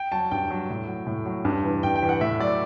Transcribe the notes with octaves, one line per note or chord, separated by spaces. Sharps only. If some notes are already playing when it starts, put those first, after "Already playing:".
Already playing: G5
F#3 A5
G2 G5
F#3
A2
F#3
A2
F#3
G2
E3
G2 G5
G5
E3
F#5
A2 E5
F#3 D5